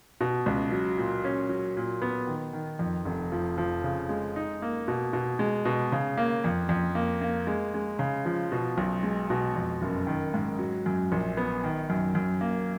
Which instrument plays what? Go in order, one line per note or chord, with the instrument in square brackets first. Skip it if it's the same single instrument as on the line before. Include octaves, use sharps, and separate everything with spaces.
[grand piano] B2
C#2
F#3
A#2
C#4
F#3
A#2
B3
D#3
D#3
F2
F1
F3
F3
C#3
G#3
D#4
A#3
B2
B2
G#3
B2
C#3
A#3
F2
F2
A#3
A#3
G#3
G#3
C#3
F3
B2
B1
G#3
B2
F2
F#1
D#3
G#2
F#3
F#2
A#1
B3
D#3
F#2
F#2
A#3